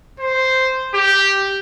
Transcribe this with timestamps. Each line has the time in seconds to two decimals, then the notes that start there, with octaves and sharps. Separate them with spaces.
0.20 C5
0.94 G4